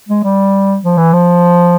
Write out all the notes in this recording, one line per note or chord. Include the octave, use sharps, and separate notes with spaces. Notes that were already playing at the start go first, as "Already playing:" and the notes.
G#3
G3
F3
E3
F3